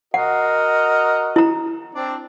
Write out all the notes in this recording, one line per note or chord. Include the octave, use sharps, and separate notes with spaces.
F#4 A#4 D#5 F#5
E4 A#5
C4 D4 D5